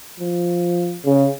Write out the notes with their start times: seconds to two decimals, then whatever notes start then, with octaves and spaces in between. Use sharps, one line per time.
0.20 F3
1.05 C#3